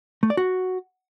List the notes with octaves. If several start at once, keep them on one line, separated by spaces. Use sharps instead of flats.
A3
D5
F#4